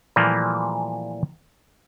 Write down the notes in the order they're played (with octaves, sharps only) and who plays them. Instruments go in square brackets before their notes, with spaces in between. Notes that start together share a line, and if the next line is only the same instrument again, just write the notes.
[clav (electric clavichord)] A#2 E3 F3 G3 A3 A#3